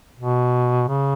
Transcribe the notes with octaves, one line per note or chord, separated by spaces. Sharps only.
B2
C#3